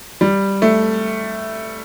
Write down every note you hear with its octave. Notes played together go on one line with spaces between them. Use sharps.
G3
A3